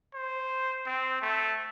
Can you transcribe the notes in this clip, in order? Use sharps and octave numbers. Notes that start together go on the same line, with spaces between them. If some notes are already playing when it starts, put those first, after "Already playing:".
C5
C4
A3